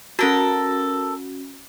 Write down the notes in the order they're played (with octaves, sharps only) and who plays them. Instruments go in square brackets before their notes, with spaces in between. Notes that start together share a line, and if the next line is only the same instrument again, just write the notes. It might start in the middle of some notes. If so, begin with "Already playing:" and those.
[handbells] C#4 F#4 [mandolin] A4 A#4